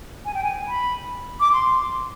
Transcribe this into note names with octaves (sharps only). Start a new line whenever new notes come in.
G#5
G5
G#5
B5
D6
C6